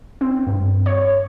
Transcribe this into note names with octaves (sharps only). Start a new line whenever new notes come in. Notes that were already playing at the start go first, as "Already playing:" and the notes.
C4
G2
C#5